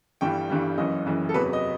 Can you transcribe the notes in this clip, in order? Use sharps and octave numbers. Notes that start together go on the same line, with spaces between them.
G1 G2 E3 G3 G5
G1 G2 E3 G3
F#1 F#2 E3 D#5
F#1 F#2 E3
A4
F#1 E2 C3 F#3 B4
D#5